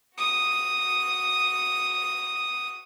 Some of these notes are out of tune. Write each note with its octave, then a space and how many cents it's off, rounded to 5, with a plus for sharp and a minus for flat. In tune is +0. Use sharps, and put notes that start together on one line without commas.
F#4 +0 D#6 +0